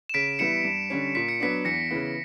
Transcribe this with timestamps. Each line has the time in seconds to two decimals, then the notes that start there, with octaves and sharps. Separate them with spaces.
0.09 E7
0.14 C#3 B6 D7
0.39 E3 G3 B3 E4 C#7 E7
0.65 G2
0.90 D3 G3 C#4
1.15 A#2 B6
1.29 C#7
1.40 F#3 B3 D4 B6
1.65 E2 A#6 C#7
1.91 C#3 E3 B3